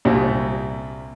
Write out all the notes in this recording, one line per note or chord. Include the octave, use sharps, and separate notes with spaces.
C2 A#2 G3